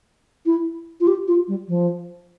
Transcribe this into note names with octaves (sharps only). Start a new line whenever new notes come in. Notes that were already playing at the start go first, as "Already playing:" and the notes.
E4
F4
G4
F4
G3
F3